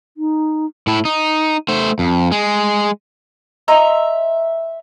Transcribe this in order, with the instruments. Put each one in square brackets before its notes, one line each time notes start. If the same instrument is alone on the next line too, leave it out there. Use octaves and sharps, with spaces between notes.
[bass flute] D#4
[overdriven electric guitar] A2 E4
D#4
A3 C5
F2
G#3
[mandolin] D#5 E5 A#5 C6